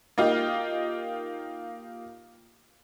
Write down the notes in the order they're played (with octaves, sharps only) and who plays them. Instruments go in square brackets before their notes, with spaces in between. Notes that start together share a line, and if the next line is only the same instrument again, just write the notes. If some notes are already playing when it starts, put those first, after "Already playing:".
[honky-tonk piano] A#3 D#4 F4 G4